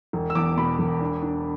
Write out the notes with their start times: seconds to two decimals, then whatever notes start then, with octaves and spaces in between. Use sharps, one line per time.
0.13 E1
0.30 E6
0.35 E2 D6
0.57 B2 B5
0.79 E1
1.01 D4
1.22 D4